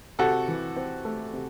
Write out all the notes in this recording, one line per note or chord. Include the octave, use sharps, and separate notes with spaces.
C3 F#4 A4
E3
C4
A3
C3